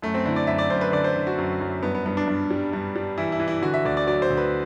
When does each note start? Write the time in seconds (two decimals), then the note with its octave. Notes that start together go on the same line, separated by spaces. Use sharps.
0.02 F#2 A3
0.14 C4
0.25 D3 E4
0.36 D5
0.47 F#2 E5
0.58 D5
0.70 F#2 C5
0.81 B4
0.92 D3 D5
1.04 C5
1.16 D3
1.27 F#4
1.38 F#2
1.61 F#2
1.83 G2 B3
1.95 B3
2.06 G2 B3
2.17 D4
2.28 G2
2.51 G3
2.73 G2
2.96 G3
3.17 E3 E4
3.32 E4
3.40 E3
3.48 E4
3.62 D3 F#4
3.74 E5
3.85 D2 D5
3.97 D5
4.07 F#3 D5
4.22 C5
4.30 D2
4.37 B4